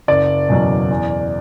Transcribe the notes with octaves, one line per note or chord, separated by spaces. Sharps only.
F#1 D5
E2 B2 F#3
E2